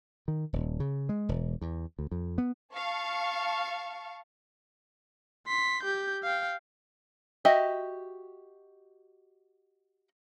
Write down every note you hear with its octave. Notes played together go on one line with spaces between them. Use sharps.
D#3
D#1
C#3
G#3
E1
E2
D2
F2
B3
F5 A5 C#6
C6 B6
G4 G6
F5 G5
F#4 G4 D#5 E5